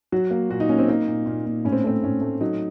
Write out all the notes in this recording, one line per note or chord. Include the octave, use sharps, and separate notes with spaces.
F#3 F#4
A#3
A#2 F#4
D#4
A#3 C#4
C4
A#3 D#4
A#2
A#2
A#2
A2 C#4
C4
A3 C4
A2 C#4
A3
F#3 D#4